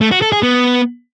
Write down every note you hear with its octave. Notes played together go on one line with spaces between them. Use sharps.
A3
F#4
A4
G#4
B3